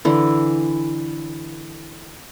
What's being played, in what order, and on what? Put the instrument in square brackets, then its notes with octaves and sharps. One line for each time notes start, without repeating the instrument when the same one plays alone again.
[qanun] D3 E3